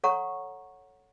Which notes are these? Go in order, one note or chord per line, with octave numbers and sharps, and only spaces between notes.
A4 C#5 F#5 A#5 C#6